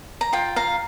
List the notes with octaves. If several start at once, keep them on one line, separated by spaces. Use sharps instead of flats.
A#5
F4 G5
F5 A#5